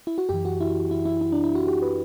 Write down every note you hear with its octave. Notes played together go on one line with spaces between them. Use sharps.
E4
F#4
F#2 E3 G4
F#4
E4
E4
E4
E4
D4
E4
F#4
G4
B4